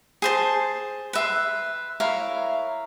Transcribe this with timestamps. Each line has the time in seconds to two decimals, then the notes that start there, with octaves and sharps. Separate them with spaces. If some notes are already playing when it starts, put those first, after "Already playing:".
0.22 G#4 C5 A5
1.13 B4 E5 C6
2.00 E4 A#4 C#5 F5